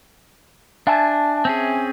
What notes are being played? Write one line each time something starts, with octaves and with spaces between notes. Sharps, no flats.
D4 E5 G#5 A5
C4 C#4 G#4